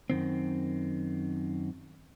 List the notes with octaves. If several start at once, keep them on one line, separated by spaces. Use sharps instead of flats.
F#2 D#3 C4